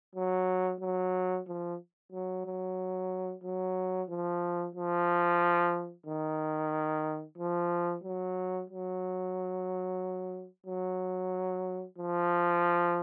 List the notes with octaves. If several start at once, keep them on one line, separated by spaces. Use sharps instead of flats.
F#3
F#3
F3
F#3
F#3
F#3
F3
F3
D#3
F3
F#3
F#3
F#3
F3